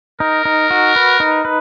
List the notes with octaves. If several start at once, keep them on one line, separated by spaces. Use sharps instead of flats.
D#4 A#4
D#4
F#4
B4
D#4
B4